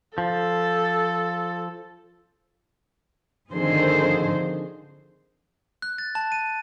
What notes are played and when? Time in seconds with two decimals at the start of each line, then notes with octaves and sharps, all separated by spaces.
0.18 F3 A4
3.51 D3 D#3 F3 C4 G#4 C5
5.82 F#6
5.98 A6
6.15 A5
6.32 D#7